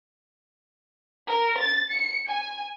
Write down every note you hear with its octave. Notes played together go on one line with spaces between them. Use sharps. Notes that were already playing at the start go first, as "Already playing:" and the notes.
A#4
A6
C#7
G#5